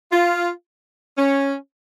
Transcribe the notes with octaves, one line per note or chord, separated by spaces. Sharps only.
F4
C#4